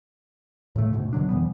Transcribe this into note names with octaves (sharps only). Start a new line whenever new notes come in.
A2 C#3 A3
D2 G#2 B2
B2 D3 F#3 D4
F2 E3 G3 B3